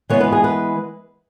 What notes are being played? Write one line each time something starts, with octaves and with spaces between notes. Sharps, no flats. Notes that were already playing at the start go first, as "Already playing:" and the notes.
E3 G#3 B3 C#5
B4
G#4
B4